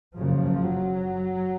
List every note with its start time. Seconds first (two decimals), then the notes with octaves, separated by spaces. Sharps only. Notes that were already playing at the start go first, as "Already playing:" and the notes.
0.16 F#1 F#2 C#3 F3
0.64 F#3